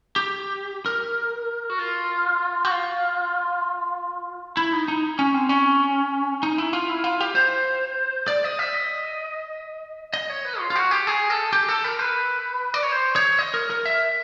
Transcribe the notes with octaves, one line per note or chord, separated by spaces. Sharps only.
G4
A#4
F#4
F4
F#4
F4
E4
D#4
D#4
C#4
C4
C#4
D#4
E4
F4
E4
F4
G4
C5
D5
D#5
E5
D#5
D#5
C#5
B4
F4
F4
F#4
G4
G#4
A4
G4
A4
A#4
B4
D5
C#5
C5
C#5
D#5
A#4
A#4
E5